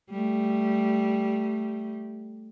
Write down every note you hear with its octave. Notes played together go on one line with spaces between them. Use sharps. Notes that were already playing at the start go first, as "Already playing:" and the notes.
G3 A3